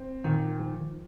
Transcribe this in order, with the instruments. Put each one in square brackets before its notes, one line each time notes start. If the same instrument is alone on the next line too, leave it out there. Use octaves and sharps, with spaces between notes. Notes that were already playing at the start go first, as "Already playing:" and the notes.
Already playing: [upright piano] C4
[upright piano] A#2 [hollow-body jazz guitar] D#3
[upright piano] F3